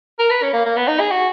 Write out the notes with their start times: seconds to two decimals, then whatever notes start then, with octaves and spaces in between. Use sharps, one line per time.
0.19 A#4
0.30 B4
0.42 C#4
0.53 A#3
0.65 A#3
0.77 B3
0.88 D#4
1.00 G#4
1.11 F#4